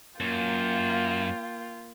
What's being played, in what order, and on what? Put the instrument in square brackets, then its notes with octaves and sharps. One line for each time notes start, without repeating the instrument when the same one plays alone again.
[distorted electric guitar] F#2 [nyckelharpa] A#3 G5 [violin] F4